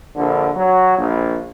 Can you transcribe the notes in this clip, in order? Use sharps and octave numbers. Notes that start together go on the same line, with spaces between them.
A#1 D3
F#3
A#1